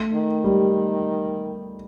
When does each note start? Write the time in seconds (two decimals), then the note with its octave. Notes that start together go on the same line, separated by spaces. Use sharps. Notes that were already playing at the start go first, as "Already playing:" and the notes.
Already playing: A3
0.13 D#3
0.44 G3